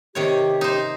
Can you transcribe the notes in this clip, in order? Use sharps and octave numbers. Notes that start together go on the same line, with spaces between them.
C3 D#3 G4 C#5
D#4 C5